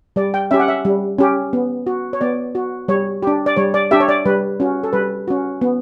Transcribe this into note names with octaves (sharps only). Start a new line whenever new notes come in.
G3 D5
G5
C#4 G4 E5
F#5
E5
G3
C#4 G4
B3
F#4
C#5
B3 D5
F#4
G3 C#5
D4 G4
D5
G3 C#5
D5
D4 G4 E5
C#5
D5
G3 B4
C#4 F#4
A4
G3 B4
C#4 F#4
B3